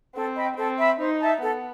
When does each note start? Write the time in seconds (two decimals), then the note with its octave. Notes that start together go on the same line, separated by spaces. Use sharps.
0.15 C4 A4
0.36 D#5 G5 B5
0.57 C4 A4
0.79 E5 B5
0.99 D#4 C5
1.20 E5 A5
1.40 B3 A4